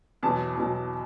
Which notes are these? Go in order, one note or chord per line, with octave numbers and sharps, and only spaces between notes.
E2 B2 F#3 A5
E2 B2 F#3